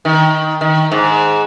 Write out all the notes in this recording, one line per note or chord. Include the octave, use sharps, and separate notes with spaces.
D#3
D#3
G#2